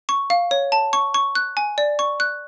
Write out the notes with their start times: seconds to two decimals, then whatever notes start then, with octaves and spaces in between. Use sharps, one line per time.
0.09 C#6
0.30 F5
0.51 C#5
0.72 A5
0.93 C#6
1.14 C#6
1.35 F#6
1.57 G#5
1.78 D5
1.99 C#6
2.20 F#6